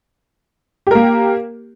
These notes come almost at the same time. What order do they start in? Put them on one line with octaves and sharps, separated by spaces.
G4 A#4 A#3